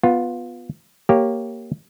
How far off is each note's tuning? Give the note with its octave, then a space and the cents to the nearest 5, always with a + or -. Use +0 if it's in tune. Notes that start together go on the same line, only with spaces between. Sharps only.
B3 +0 F4 +15
A#3 +0 G4 +0 C#5 +0